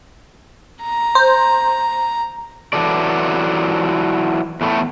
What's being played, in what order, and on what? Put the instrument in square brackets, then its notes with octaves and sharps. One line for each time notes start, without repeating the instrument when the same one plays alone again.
[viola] A#5
[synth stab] C5
[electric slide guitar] E3 F#3 A4 D5
E2 A2 A3